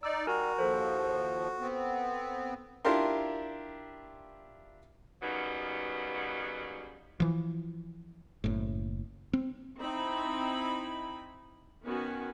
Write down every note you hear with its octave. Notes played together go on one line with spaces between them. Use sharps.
D#4 D5 E6
G3 F#4 A#4 G#5 A#5
D#2 F3 A4 C5
B3 C4
D4 E4 F4 G4 A#4 C6
D#2 C#3 F#3 G3 B3 D#4
E3 F3
F#1 A2
C4
C4 D#4 E4 B5
D#3 B3 C#4 F#4 G#5